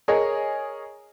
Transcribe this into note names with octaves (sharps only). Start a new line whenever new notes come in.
G#4 A#4 C#5 D#5